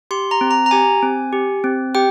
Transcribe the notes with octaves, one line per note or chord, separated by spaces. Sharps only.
G4 C6
A#5
C4
A#5
A#5
G4 G#5
C4
G4
C4
G4 G5